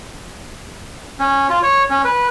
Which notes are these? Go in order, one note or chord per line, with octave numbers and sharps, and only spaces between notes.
C#4
F4
C#5
C#4
B4